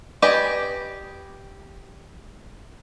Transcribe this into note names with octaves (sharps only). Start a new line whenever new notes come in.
G4 B4 D5 D#5 G#5